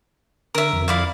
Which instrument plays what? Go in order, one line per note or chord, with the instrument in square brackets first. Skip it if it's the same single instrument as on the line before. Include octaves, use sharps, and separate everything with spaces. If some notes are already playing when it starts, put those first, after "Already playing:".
[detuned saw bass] D3 [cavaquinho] A#4 E5
[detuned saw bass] F2
[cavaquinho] E4 D5 F5